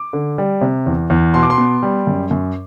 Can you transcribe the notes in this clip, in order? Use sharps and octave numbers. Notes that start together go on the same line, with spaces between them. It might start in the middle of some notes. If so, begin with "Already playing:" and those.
Already playing: D6
D3
G3
C3
E2
E2
B2 C6
D6
C6
B3
G3
F#2
F#2